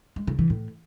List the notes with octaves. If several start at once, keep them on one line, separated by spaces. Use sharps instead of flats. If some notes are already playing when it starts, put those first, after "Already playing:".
G#3
C#3
E3
A2